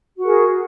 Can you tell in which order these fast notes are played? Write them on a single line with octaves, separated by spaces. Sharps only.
F#4 A#4 G#4